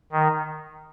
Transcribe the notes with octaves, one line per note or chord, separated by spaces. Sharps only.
D#3